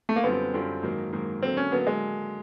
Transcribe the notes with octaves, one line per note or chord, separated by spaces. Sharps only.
A3
A#3
F#2 D3 G3 B3 C4 F4
F#2 D3 G3 C4 F4
G#2 D#3 F#3 A#3
G#2 D#3 F#3 A#3
D3 F#3 A#3 C4
C#4
D3 F#3 A#3 B3
G#3